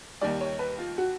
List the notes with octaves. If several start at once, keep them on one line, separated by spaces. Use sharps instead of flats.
D#2 D#3 G3 D5
C#5
B4
F4
F#4